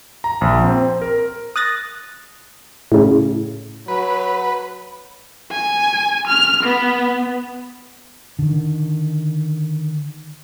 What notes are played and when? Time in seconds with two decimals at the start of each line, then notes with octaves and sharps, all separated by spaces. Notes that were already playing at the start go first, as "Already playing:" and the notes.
0.24 A#5
0.41 A#1
0.64 C4
0.78 C5
1.02 A#4
1.56 D#6 F#6 A6 A#6
2.92 A2 C#3
3.88 F#3 B4
5.52 G#5
6.27 F6
6.64 B3
8.39 D3 D#3